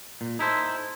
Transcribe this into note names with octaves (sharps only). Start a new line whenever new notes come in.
A#2
D#4 E4 A4 C5